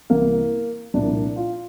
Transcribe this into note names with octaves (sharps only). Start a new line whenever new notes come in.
C2 C3 E3 A#3
C2 A#2 F3 D4
F4